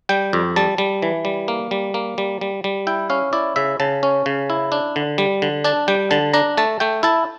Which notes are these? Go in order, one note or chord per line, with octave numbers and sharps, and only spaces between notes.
G3 G5
F2
G3 A5
G3
E3
G3
A#3
G3
A#3
G3
G3
G3
E4 G5
C#4 F5
E4 D5
C#3 E5
C#3 A5
C#4
C#3
E4
D4
D3
G3
D3
D4 A5
G3 G5
D3 A5
D4 A#5
A3 A5
A3 G5
E4 A5